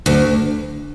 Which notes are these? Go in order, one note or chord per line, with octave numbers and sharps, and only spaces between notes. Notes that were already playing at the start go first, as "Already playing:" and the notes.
D2